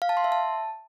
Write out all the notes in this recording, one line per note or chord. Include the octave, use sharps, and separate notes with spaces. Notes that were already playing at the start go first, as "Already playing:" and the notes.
F5
A5
C6
E5
A5